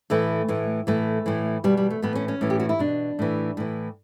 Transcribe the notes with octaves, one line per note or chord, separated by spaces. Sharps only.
A2 E3 A3
A2 E3
A2 E3 A3
A2 E3
B2 G3
G3
A3
A2 E3 B3
C#4
C#4
A2 E3
G4
F#4
E4
B2 D4
A2 E3
A2 E3